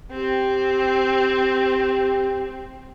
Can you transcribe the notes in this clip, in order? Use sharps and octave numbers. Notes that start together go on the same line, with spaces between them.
C4 G4